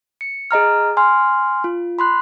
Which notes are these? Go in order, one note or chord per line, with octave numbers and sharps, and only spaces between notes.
C#7
G#4 D#5 A#5 F6
G#5 C6 F6
F4
B5 C6 F#6